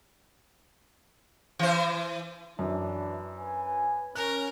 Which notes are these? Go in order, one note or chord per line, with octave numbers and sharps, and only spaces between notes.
E3 C5
F#2 E3 D4
B4 G#5
C#4 A#4 F#6